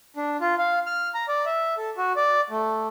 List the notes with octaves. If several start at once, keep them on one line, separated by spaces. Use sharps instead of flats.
D4
F4
F5
F6
A#5
D5
E5
A4
F#4
D5
A3